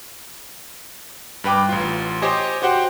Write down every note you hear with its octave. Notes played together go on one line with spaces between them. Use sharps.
G2 B4 G5 D6
A1 F4
G4 C5 C#5 D#5 G#5
F#4 G4 C5 F#5 G5